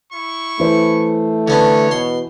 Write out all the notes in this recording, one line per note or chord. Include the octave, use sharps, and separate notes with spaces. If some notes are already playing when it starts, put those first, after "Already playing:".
E4 C#6
E3 A3 C5
D3 B3 C#4 C#5
B2 C6